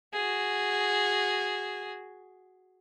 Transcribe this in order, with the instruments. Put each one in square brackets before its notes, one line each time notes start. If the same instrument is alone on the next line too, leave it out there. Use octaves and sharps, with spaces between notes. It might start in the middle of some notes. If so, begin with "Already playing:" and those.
[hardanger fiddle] F#4 G#4